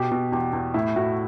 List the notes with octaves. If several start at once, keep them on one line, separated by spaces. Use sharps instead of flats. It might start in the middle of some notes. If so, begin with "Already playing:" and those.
Already playing: B2 G4
B2
E2 G4
E2
A2 E4
A2 F#4